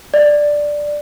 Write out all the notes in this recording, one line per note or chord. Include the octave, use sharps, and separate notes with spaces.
D5